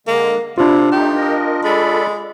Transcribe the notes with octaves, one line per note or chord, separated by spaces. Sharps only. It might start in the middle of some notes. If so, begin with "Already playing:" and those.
D3 G#3 A#3
C3 D4 E4 F4
A3 D#4 G4
A#4 D#5
G#3 A4 D5 B5